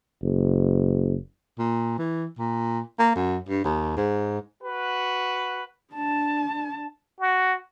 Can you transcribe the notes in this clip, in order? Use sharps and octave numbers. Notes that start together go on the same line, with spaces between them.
F#1
A#2
E3
A#2
A#3
F#2
G2
D#2
G#2
F#4 B4
D4 A5
F#4